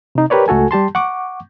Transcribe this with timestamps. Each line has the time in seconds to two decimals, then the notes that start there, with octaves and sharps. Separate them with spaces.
0.15 C3 D#4
0.30 G4 A#4 B4 C#5 D5
0.48 C#2 A3 F#4 A4 G#5
0.71 G3 G4 A5 C6
0.95 F#5 C#6 D6